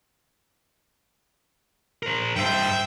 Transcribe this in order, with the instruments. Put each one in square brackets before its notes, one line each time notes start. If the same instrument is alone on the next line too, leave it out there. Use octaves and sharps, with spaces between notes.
[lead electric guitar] A#4 C5
[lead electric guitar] G2 C5 [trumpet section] E5 G5